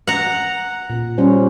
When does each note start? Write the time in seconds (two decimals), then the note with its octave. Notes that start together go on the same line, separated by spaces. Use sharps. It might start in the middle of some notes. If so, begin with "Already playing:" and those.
0.07 F#5 A#5
0.90 A#2
1.18 G3 C#4 C5